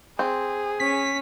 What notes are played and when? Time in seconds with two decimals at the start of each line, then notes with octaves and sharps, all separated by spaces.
0.19 C4 G#4
0.80 C#4 B6